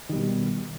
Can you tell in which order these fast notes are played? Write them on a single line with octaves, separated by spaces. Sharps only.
D#3 G3 B2